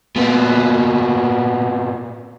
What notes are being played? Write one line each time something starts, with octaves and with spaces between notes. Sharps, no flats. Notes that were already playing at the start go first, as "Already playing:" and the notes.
A#2 B3